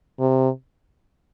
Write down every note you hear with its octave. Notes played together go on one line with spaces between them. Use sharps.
C3